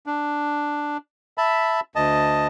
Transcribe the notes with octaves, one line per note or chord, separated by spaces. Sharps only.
D4
E5 A5 B5
D2 D#5 A5